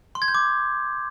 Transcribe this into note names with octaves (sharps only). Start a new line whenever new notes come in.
C6
G#6
G6
D6